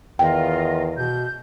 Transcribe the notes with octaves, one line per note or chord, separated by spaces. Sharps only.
E2 D#3 F4 D#5 G5
B2 G6